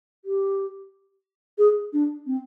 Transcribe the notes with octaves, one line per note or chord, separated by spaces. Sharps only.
G4
G#4
D4
C4